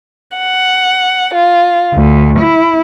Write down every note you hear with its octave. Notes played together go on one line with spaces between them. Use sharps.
F#5
F4
D2
E4